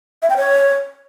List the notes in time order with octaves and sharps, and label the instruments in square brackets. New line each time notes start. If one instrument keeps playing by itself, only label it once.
[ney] E5
G5
C#5